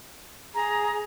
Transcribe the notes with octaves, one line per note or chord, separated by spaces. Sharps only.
G#4 A#5